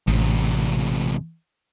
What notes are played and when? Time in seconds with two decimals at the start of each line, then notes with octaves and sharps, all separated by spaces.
0.08 A1 E2 C3